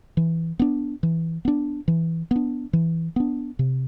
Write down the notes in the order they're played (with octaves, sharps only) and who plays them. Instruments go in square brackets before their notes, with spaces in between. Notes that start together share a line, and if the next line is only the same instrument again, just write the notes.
[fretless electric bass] E3
B3 D4
E3
B3 D4
E3
B3 D4
E3
B3 D4
C3